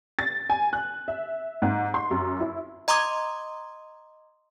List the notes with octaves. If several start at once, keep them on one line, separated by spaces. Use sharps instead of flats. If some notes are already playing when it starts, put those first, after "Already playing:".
A6
G#5
F#6
E5
G#2
C6
F#2
E4
D#5 A#5 C6 D6 D#6 G#6